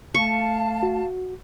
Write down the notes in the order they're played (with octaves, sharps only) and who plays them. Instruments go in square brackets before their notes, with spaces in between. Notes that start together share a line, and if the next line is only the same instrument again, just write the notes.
[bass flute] A3 [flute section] F5 A5 [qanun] C#6
[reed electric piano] F#4